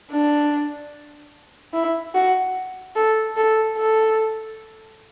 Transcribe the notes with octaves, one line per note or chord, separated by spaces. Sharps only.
D4
E4
F#4
A4
A4
A4